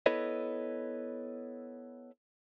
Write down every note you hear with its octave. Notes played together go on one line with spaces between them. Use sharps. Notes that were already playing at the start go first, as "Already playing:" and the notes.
B3 E4 A4 B4 C#5 D#5